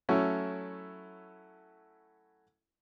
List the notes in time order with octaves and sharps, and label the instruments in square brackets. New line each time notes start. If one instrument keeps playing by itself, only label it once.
[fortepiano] F#3 A3 C#4 E4